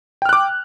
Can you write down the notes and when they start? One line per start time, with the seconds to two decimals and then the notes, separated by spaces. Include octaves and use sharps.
0.22 G5
0.26 F6
0.29 F#6
0.33 D6